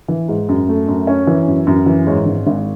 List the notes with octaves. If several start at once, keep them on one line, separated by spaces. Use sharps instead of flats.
E3
G#2
F#2
A3
F#2
C#4
E3
F#2
F#2
E3
G#2 C#5
G#1
G#1